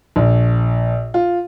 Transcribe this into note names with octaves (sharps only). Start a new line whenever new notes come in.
A#1
F4